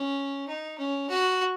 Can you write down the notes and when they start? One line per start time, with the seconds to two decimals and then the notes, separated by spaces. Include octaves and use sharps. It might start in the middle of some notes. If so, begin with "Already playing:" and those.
Already playing: C#4
0.48 D#4
0.78 C#4
1.10 F#4